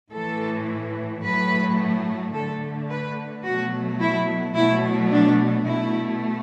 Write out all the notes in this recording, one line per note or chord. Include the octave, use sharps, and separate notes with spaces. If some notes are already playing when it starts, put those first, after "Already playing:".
A2 E3 A3 A4
A2 F#3 A3 B4
D3 A3 A4
B4
B2 F#3 A3 F#4
E4
B2 F#3 A3 E4
D4
B2 A3 E4